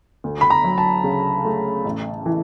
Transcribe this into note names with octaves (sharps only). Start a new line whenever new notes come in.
D2
B5
A#5
F#3
A5
C#3
A3
A1
E3